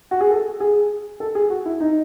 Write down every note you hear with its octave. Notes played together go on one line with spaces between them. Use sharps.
F#4
G#4
A4
G#4
A4
G#4
F#4
E4
D#4